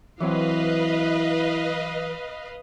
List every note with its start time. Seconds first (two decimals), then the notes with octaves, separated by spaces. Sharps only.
0.21 E3 F#3 C4 E4 B4 D#5 F5